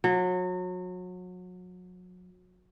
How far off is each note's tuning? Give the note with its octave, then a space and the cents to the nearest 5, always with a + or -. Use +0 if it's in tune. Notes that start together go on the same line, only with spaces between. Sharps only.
F#3 -30